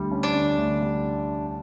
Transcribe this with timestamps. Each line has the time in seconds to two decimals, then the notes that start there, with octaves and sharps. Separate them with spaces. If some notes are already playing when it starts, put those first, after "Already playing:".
Already playing: D2 D3 G3
0.12 C#4
0.23 D4
0.35 D3
0.58 D2
0.82 G3